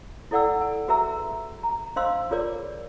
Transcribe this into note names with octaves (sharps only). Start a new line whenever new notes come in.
E4 A4 D5 F#5 G5 E6
G#5
F#4 G#4 B4 E5 A#5 E6
A#5
D4 C5 D#5 F5 C6 E6
F4 G#4 A#4 C#5 D5 D6